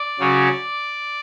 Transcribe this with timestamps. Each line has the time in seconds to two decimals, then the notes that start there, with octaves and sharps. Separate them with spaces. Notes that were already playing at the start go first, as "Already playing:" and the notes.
Already playing: D5
0.20 C#3 F#3 C#4